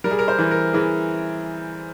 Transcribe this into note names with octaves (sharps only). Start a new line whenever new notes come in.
G3 A#4
G#4
A#4
C5
E3
A#4
E3 G#4